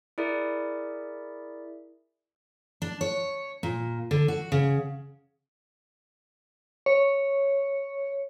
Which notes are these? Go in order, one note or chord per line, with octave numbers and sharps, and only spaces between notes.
E4 G#4 A#4 D5 E5
D4
C#5
A#2
D3
F#4
C#3
C#5